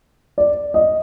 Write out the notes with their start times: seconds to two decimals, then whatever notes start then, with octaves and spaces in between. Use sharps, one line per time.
0.38 D5
0.74 D#5